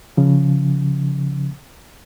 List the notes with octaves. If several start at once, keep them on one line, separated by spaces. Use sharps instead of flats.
C#3 F3